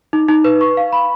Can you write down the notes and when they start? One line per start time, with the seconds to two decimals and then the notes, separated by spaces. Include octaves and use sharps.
0.13 D#4
0.28 D#4
0.44 B4
0.61 C#6
0.77 F5
0.93 B5